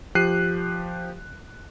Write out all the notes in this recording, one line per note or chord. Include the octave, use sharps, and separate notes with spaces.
F3 G4 F#6 C7 D#7